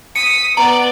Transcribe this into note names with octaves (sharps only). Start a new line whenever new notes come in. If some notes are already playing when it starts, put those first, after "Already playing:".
D#6 B6 C#7
B3 D5 A#5